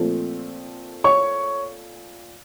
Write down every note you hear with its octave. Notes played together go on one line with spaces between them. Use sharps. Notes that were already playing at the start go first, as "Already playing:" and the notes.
Already playing: A#2 F3 A3 C4
C#5 C#6